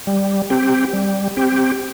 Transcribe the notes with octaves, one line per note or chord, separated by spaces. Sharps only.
G3
C4 G4
G3
C4 G4